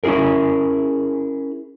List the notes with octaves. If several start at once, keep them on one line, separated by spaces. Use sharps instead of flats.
C#4 E4 F4 G#4 A#4